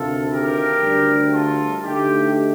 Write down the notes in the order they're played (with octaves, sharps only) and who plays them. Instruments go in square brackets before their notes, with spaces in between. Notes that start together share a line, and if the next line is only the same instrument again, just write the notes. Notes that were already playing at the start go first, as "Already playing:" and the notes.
Already playing: [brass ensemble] D2 C3 D#3 A3 F4 A4
G4 A#4
D2 D3 G3
F4 A4
D2 D3 A3 D#4 G4